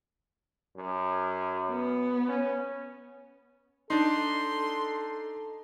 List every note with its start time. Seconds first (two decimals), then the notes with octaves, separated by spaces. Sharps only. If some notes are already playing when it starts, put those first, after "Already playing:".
0.77 F#2
1.70 B3
2.29 C#4
3.90 D4 D#4 A4 C6